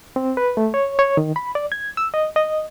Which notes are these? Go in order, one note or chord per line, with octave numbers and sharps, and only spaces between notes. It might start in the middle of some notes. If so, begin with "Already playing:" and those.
C4
B4
A3
C#5
C#5
D#3
B5
D5
G#6
E6
D#5
D#5